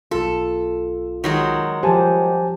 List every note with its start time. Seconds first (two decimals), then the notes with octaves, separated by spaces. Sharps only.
0.11 B1 F4 A4
1.24 D#3 F#3 G#3
1.83 F3 G4 C5 G#5 A5